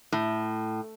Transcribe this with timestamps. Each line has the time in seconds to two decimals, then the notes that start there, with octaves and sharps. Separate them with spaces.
0.12 A2